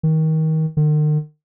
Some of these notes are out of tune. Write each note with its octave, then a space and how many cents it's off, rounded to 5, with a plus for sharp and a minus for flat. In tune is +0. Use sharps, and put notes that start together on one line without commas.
D#3 +25
D#3 -45